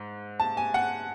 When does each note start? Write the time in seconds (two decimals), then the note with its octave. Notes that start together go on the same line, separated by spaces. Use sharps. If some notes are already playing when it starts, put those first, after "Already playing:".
Already playing: G#2
0.40 A5
0.57 G#5
0.74 F#5